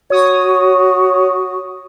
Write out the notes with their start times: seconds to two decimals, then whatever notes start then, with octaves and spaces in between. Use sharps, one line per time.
0.10 F#4 C#5 D#6